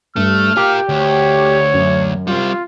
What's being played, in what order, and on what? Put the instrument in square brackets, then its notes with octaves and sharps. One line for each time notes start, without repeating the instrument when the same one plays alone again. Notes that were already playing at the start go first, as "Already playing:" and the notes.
[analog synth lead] G2 [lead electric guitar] A3 [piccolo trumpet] F6
[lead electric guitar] F4 A#4 [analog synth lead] G4
[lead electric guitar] D2 [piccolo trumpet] C#5
[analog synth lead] F#2
[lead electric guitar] G3 C4 [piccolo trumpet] F4